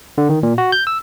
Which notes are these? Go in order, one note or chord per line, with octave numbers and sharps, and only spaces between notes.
D3
D#3
A#2
F#4
G6
E6